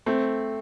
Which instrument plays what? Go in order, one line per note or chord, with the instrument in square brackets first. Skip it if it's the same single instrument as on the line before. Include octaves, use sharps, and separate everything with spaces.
[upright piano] A3 C4